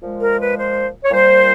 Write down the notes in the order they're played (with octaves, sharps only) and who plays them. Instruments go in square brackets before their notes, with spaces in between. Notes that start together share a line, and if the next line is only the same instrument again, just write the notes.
[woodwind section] A#2 F3 G#3
A#4
B4
C5
C#5
A#2 G3 C5